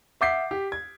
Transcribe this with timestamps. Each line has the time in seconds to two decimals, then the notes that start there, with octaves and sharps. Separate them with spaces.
0.21 E5 F#5 D6 G6 B6 C7
0.51 G4
0.72 G#6